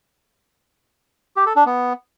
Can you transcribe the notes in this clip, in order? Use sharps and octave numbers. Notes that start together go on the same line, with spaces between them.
G4
A4
D4
B3